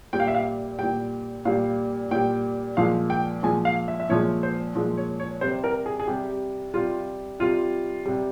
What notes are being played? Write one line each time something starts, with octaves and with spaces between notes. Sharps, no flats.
A#2 G3 G5
F5
E5
F5
A#2 G3 G5
A#2 G3 F5
A#2 G3 G5
A#2 F3 G#3 F5
G5
A#2 F3 G#3 G#5
F5
E5
E5
A#2 F3 G#3 C#5
C5
A#2 F3 G#3
C#5
C#5
C3 G3 C5
A#4
G#4
G#4
C3 G3 G4
C3 G3 F4
C3 G3 F4
C3 G3